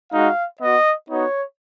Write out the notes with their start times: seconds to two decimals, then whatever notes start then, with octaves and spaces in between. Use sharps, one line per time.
0.11 G#3 D#4 F#4 F5
0.60 B3 F#4 D#5
1.09 B3 D#4 F#4 C#5